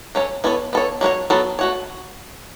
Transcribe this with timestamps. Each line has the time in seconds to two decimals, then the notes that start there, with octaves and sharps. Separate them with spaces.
0.15 F#3 C#4 A4 C#5
0.44 B3 E4 A4 C#5
0.73 B3 A4 C#5
1.01 F#3 A3 F#4 C#5
1.30 F#3 B3 A4
1.59 A3 F#4 C#5